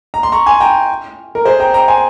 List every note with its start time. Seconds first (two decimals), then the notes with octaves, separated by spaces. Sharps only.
0.14 A#5
0.23 C6
0.32 A#5 C#6
0.46 G#5 C6
0.60 G5 A#5
1.35 A#4
1.45 G#4 C5
1.60 G5 A#5
1.74 G5 A#5
1.88 G#5 C6